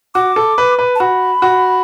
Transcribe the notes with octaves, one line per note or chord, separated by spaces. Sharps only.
F#4 D6
A4
B4
B4
A5
F#4 B5
F#4